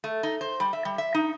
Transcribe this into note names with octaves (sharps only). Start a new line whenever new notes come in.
A3
D#4
C5
G3
E5
G3
E5
D#4